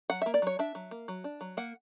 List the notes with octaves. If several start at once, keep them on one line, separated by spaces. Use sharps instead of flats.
F#3 F#5
A#3 E5
D5
F#3 C#5
D4 E5
F#3
A#3
F#3
D4
F#3
A#3 F#5